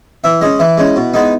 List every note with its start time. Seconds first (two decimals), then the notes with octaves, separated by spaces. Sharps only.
0.24 E3 E5
0.41 G#3 C#4 D#5
0.59 E3 E4
0.78 G#3 C#4
0.96 B2
1.14 G#3 B3 D#4